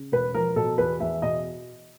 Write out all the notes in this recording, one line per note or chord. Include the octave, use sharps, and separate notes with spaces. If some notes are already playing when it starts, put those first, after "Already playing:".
Already playing: C#3
E1 B4
F3 A#4
B2 A4
E2 B4
E2 E5
B2 D#5